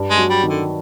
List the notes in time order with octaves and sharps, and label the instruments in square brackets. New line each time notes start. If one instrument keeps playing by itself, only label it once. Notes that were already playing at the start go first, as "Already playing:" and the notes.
Already playing: [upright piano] G2
[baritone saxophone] G#3
[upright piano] F#3
[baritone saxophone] G3
[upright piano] D#3
[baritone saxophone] D3